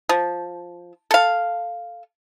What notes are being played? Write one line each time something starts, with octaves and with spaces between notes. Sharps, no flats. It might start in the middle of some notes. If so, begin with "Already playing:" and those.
F3
A4 F5